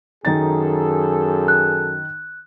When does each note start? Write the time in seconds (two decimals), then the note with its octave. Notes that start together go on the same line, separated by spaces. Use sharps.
0.25 F#2 D#3 D#4 G#4 A4 A6
1.48 F#6